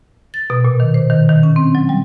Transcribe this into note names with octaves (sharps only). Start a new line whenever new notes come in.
A6
B2
A#2
D#3
C5
D#3
D#3
C#4
C4
F#3
G3